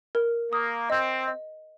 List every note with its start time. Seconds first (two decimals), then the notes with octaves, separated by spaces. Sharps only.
0.15 A#4
0.52 A#3 D#6
0.90 C4 D#5
1.28 D#5